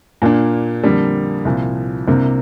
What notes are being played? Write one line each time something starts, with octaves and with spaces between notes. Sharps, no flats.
A#2 A#3 D4
F2 D3 G3 A#3
C2 A#2 F3
C2 C3 A#3 D4